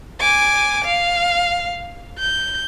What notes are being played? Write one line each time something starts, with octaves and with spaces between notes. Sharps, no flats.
G#5 D6
F5
G6